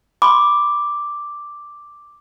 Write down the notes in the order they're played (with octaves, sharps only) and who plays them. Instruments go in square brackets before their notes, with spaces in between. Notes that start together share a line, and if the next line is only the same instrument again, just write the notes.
[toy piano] B5 C6 [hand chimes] D6